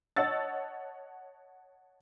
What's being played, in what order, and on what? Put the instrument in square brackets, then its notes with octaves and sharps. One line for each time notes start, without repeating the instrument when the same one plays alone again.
[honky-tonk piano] C#5 D#5 F#5 A5 E6 A6